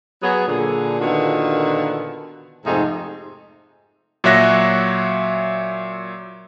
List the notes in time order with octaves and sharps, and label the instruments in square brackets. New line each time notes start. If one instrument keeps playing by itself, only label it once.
[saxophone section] F#3 B3 G#4
A#2 D3 G#4
A#2 D3 D#3 B3 F4 F#4
F2 G#2 C3 A3 D#4
[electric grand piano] A#2 F#3 C#5 E5 F#6 A#6